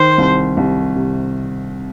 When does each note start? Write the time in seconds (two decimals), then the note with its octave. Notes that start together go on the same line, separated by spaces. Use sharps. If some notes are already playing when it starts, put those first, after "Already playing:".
Already playing: D#3 C5
0.18 C2
0.57 C2
0.96 C3